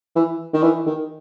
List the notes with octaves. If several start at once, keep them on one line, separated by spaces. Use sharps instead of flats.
E3
D#3
E3
D#3